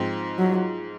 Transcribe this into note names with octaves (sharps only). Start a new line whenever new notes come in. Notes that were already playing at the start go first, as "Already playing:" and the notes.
Already playing: G#2 F3 C4
F#3